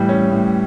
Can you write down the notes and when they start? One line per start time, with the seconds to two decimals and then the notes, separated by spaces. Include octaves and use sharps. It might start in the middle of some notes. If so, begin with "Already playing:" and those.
Already playing: A2 E3 G3
0.09 C#4
0.32 A2